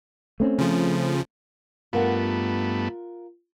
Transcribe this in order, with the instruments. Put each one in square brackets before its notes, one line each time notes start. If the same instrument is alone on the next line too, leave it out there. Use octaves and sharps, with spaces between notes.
[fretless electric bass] A3 C4 C#4
[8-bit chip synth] C#3 F3
[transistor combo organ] G2 A3 B3 [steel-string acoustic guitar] F4 A#4 F#5